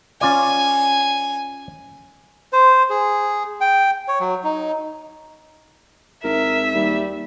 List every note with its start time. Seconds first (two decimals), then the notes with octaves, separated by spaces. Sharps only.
0.21 C#4 F4 D5 G#5
2.53 C5
2.90 G#4
3.61 G5
4.08 C#5
4.20 F#3
4.44 D#4
6.24 G#1 A#4 E5
6.75 D#2 G3